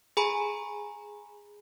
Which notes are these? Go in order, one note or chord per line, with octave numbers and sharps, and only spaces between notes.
G#4 G#5 A#5 B5